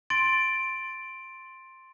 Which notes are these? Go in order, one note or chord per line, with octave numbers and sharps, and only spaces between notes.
C6 A6 D7